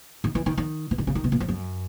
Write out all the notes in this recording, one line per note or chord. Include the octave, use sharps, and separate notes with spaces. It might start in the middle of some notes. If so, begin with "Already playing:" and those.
D#3
E3
D#3
D#3
E3
D#3
C#3
D#3
B2
A#2
G#2
F#2